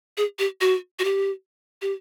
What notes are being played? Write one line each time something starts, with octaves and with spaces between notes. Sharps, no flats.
G#4
G4
F#4
F#4
G4
G4